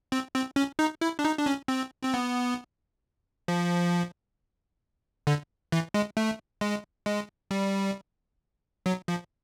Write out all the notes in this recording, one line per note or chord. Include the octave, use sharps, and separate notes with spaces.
C4
C4
C#4
D#4
E4
D4
D#4
D4
C#4
C4
C4
B3
F3
D3
E3
G#3
A3
G#3
G#3
G3
F#3
F3